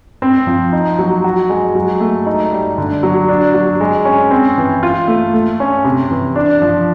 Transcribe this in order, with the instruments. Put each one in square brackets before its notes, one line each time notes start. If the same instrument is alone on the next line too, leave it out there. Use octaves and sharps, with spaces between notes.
[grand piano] C4
F3
D#4
F#3
F#4
G#3
F#3
A3
D#4
G3
D3
F#3
D4
F#3
G#3
C#4
C4
E3
F4
A3
A3
C#4
C3
E3
D4
F3